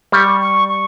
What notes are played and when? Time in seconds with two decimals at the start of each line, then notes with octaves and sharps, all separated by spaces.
0.12 G3 C#6
0.40 C#6
0.68 C#6